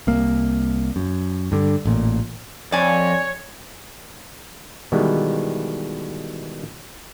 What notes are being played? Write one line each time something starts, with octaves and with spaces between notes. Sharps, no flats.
C2 A#3
F#2
G2 D3
A1 A#2
F2 C#5 D5 G#5 G#6
B2 D#3 E3 G3 G#3 B3